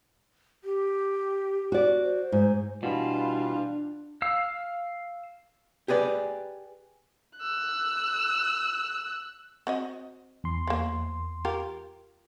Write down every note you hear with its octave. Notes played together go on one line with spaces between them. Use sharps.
G4
F#4 D5
C5
G#2
B2 E3 G3 D4 F4
F5 E6
G4 G#4 B4 D5
E6 F#6
C4 F#4 D#5
E2 C6
F3 A#3
F4 G4 A#4